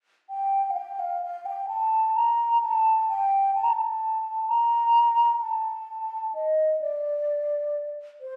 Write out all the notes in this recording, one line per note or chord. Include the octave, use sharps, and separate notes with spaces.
G5
F5
G5
F5
F5
G5
A5
A#5
A5
G5
A5
A#5
A5
A#5
A5
D#5
D5
C5